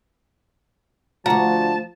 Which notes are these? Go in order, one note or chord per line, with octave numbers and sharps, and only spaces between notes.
D2 F3 F#4 A5 A#5